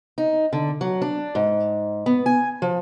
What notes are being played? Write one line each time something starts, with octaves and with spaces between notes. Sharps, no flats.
D#4
D3
F#3
D4
G#2
B3
G#5
F3